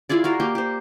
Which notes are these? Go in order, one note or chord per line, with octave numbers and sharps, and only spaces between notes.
E4 F4 G#4 D5
F#4 A#4 F5
A#3 G4 G5
G4 C5